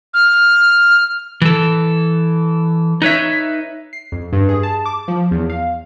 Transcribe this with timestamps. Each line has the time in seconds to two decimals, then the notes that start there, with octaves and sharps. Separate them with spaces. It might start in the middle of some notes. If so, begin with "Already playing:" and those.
0.14 F6
1.42 E3 A4
3.02 D#4 B4 C#5 E5
3.93 C7
4.12 F2
4.33 G2
4.49 G#4
4.63 A5
4.86 D6
5.08 F3
5.31 E2
5.50 F5